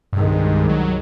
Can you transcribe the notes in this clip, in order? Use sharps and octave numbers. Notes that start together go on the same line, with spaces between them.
C2 G2 D#3 G#3
F#3